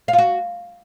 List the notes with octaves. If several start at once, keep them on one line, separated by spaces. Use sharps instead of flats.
F5
F4
F#4